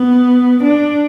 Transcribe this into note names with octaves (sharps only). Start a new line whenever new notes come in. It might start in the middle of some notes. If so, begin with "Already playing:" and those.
Already playing: B3
D4